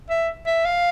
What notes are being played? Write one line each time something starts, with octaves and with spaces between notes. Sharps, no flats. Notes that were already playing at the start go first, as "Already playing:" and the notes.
E5
E5
F5